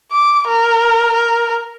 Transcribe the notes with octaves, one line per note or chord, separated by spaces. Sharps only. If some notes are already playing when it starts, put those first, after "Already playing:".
D6
A#4
A#4